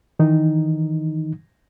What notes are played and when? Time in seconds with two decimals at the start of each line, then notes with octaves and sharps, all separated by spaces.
0.19 D#3 E3 D#4